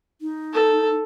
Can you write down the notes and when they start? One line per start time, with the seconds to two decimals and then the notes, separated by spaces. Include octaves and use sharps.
0.21 D#4
0.53 A4